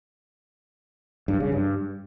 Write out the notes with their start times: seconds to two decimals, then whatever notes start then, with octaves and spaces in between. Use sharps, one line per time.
1.28 G2
1.40 C#3
1.52 G2